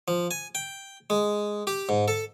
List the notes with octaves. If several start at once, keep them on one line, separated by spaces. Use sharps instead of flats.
F3
G#5
G5
G#3
G4
G#2
A4